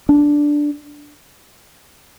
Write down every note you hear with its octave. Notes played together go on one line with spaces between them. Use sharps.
D4